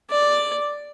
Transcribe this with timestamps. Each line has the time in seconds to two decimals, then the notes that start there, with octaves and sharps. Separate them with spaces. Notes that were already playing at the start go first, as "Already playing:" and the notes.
0.10 D5